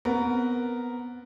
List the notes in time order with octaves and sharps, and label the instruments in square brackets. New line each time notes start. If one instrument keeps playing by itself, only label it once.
[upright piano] B3 A#4 [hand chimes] C4